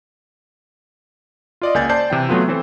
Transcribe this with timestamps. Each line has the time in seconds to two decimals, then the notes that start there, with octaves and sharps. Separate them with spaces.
1.62 F4 D5 D#5
1.74 C#2 A#3 G#5 G6 A6
1.89 C5 D5 A5 G6 C7
2.10 C3 E3 G5
2.29 C3 F#3 A3 B3 F4
2.48 E3 C4 A4 C5